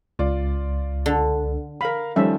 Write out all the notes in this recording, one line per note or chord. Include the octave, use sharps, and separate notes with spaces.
C#2 F4 D5
D3
A#4 F5 B5
D#3 F3 G3 A3 C#4 E5